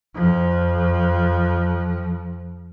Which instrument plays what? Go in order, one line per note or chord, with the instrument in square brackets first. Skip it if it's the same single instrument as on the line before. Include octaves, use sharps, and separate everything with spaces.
[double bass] F2 F3